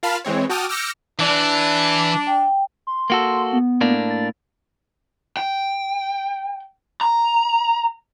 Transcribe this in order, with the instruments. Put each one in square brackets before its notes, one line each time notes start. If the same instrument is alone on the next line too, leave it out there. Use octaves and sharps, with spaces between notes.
[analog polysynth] F4 A#4 F5 A5 B5 F6
E3 G#3 C4 C#5
F#4 G5 A5 D6 D#6 F6
D6 E6 F6 G6 A#6 C#7
[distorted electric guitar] E3 [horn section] D4
[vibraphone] G5
[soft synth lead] C6
[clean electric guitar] A#3 F#4 A4
[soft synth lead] B3
[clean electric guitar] A2 A#3 D4
[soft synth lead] A6
[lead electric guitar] G5
A#5